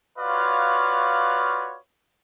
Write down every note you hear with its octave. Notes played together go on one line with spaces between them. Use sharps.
F4 F#4 B4 C#5 D5 F5